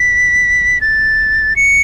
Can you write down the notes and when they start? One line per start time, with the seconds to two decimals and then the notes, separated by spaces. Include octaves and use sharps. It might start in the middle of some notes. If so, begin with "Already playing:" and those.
Already playing: B6
0.81 A6
1.56 C#7